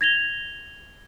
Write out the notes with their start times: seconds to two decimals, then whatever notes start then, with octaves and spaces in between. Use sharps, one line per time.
0.01 G#6 A#6 F7 G7